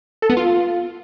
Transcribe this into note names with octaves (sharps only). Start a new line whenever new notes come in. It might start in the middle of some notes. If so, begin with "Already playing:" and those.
A4
B3
F4